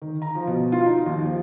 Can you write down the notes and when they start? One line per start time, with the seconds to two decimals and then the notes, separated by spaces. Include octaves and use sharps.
0.02 D#3
0.22 A#5
0.35 F3
0.47 B2
0.72 F4
0.86 D#4
1.06 D#2
1.25 F3